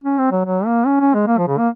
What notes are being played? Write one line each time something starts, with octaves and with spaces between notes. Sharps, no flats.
C#4
C4
F#3
F#3
A#3
C#4
C#4
G#3
A#3
F3
C#3
A#3